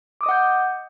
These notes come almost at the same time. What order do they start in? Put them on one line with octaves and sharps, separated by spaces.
D6 D#6 D#5 F#5 G6